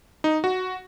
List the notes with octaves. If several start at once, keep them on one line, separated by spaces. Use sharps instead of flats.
D#4
F#4